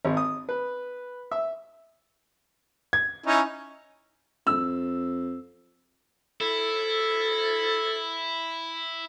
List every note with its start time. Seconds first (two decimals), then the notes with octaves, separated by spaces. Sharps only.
0.05 G#1
0.17 D#6
0.49 B4
1.31 E5
2.93 G#6
3.26 C#4 D#4 E4
4.47 F2 E6
6.41 E4 A4